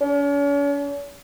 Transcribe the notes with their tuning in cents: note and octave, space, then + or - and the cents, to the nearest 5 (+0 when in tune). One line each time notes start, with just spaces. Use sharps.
C#4 +45